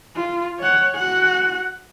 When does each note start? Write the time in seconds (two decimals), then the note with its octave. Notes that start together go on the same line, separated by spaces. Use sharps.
0.16 F4
0.59 C#5 F#5
0.96 F#4 F#5